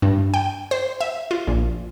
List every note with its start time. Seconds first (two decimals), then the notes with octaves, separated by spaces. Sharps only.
0.02 G2
0.34 G5
0.71 C5
1.01 E5
1.31 F4
1.47 A#1